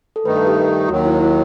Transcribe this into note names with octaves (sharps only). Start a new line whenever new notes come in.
A4
G2 D#3 A3 D#4 B4
A4
G4
D#2 D#3 F#3 F#4
E4
E4